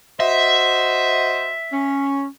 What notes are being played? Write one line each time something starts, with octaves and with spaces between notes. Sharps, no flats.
F#4 C5 D#5 E5
C#4